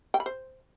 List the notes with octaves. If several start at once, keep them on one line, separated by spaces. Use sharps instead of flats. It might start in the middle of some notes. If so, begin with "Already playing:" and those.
G5
B5
C5